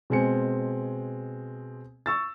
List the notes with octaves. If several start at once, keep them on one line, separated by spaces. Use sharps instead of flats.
B2 G#3 C4 G#5 C#7
C#6 E6 A6